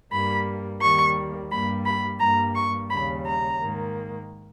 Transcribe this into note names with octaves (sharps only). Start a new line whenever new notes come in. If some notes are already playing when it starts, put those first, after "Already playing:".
G2 G3 A#3 B5
D#2 D#3 G3 A#3 C#6
G2 G3 A#3 B5
B5
G2 G3 A#3 A#5
C#6
D#2 C#3 G3 B5
A#5
G#2 D#3 A#3